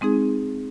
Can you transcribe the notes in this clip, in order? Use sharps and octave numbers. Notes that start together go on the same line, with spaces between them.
G#3 C4 D#4 G#4